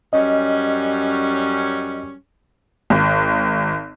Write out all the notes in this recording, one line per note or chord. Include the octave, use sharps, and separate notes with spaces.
F#2 G3 C#4 D#5
G#1